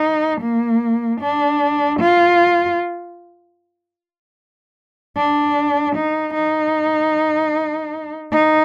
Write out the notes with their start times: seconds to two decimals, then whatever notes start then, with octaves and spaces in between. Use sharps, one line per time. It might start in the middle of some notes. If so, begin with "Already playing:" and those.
Already playing: D#4
0.41 A#3
1.21 D4
2.00 F4
5.16 D4
5.95 D#4
6.34 D#4
8.32 D#4